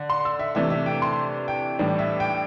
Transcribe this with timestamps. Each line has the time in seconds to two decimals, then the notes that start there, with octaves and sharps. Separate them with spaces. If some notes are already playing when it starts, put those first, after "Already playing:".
Already playing: D3
0.10 C6
0.25 E6
0.39 E5
0.55 C3 E3 A3 D4 E5
0.70 E5
0.86 G5
1.02 C6
1.48 G5
1.79 A2 E3 G3 D4
1.99 E5
2.20 G5